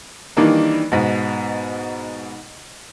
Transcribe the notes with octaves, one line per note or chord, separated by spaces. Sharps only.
D#3 E3 G3 A#3 D4 D#4
G#2 B2